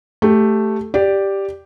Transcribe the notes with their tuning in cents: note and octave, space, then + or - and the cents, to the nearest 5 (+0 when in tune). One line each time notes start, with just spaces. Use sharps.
A3 +0 G4 +0
G4 +0 D5 +0